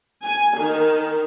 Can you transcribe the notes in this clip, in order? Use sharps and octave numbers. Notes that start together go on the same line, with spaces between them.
G#5
D#3